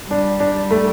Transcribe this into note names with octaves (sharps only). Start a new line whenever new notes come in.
G3 D4
D4
A3